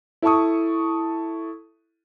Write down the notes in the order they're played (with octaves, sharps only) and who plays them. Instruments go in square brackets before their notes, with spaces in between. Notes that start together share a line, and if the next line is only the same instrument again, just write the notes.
[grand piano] E4 A4 A5 C#6 D#6